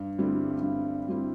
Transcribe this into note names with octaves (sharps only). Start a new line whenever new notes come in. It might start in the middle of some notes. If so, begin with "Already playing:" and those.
Already playing: G2
D3 G3 C4 E4
G2
D3 G3 C4 E4